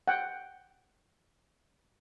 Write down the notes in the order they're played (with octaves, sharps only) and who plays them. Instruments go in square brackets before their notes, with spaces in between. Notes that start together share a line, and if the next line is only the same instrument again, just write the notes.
[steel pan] F#5 G5